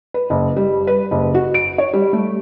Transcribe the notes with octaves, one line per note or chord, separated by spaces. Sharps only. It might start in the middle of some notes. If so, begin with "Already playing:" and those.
B4
F#1
G3
B4
F#1
F#4
D7
C#5
G3
A3